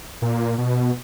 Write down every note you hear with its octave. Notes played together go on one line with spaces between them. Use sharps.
A#2
B2